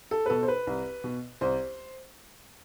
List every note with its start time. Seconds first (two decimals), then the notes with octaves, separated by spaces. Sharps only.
0.11 A4
0.26 B4
0.30 B2 A4
0.43 C5
0.48 B4
0.67 C2
1.04 B2
1.41 C2 C5